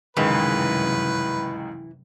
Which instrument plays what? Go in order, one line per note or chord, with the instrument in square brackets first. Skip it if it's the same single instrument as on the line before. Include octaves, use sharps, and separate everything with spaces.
[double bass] F1 F#2 [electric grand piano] C#2 D#3 G#3 [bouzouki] E3 [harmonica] B4